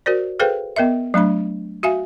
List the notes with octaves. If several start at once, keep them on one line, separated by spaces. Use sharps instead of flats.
F#4 A#4 C5 D5
G#4 A4 B4 C5 F5 G5
B3 A#4 D#5 E5
F#3 A3 D4 B5
F#4 E5 F5 G#5